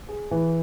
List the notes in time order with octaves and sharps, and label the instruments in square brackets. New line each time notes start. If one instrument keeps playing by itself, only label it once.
[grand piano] G#4
E3